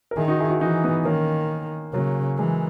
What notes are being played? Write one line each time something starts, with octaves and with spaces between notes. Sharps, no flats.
A#4
D#3 E4 G#4
D#4 F#4
E4 G#4
D#4 F#4
E3 D#4 F#4
B3 D#4
D#3 A#3 C#4
C#3 F#3 A#3
E3 G#3